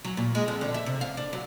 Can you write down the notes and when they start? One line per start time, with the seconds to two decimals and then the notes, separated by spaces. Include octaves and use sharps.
0.05 F#3
0.17 A#2
0.35 G#3
0.48 F2
0.61 D3
0.74 E5
0.86 C3
1.01 F5
1.17 D4
1.33 F#3